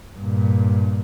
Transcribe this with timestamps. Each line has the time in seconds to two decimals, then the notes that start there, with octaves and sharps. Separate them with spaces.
0.16 G2 A#2